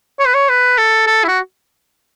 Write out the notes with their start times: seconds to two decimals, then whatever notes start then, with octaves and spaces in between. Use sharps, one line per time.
0.19 C#5
0.26 B4
0.34 C#5
0.49 B4
0.77 A4
1.07 A4
1.24 E4
1.28 F#4